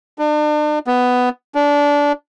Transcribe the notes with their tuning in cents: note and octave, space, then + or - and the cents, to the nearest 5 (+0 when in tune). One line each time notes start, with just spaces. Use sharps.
D4 +40
B3 +10
D4 -20